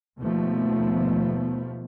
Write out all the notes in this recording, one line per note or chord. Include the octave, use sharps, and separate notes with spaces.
D#2 B2 F3 A3 B3